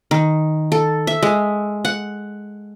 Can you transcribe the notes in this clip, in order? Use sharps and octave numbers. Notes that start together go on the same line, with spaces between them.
D#3
A4
E5
G#3
F#5